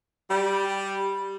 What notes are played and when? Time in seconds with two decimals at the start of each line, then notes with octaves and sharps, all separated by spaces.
0.30 G3